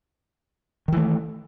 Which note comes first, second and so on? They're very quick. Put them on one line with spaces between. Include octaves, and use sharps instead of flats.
D#3 E3 A3